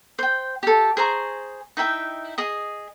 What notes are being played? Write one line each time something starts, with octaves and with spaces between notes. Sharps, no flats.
C5 G5
G4 A4
G#4 C5 A#5 C#6
D#4 E4 E5 G5
G#4 D#5 D#6